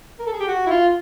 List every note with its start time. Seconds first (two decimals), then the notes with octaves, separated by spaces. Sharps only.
0.19 A#4
0.26 A4
0.33 G#4
0.40 G4
0.48 F#4
0.67 E4
0.70 F4